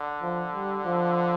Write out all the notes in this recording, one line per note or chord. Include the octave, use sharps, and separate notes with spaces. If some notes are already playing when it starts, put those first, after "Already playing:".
Already playing: D3
F3
G3
F3